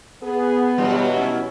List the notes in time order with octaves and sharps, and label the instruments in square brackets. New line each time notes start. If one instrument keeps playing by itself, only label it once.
[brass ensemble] B3 [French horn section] G#4
[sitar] G2 G3 [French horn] B2 [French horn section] E3 F#3
[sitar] C#4 E4